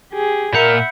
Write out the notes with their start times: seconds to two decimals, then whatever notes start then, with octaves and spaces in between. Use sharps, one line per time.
0.13 G4 G#4
0.53 A#2 A#4 E5 F#5 A#5 B5 G6 C#7